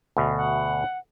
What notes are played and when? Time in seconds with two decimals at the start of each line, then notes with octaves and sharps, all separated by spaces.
0.17 D2 B2
0.37 F#5